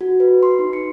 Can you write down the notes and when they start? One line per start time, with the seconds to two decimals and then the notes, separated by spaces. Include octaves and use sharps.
0.01 F#4
0.20 B4
0.43 C6
0.59 D#4
0.73 C#7